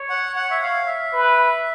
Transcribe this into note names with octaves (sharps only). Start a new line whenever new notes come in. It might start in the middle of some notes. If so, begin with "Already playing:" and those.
Already playing: C#5
F#5
F#5
E5
F5
E5
B4